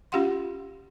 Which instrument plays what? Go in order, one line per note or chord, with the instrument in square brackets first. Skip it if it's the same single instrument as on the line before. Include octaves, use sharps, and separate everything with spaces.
[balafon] C#4 F4 G4 F5 F#5 C6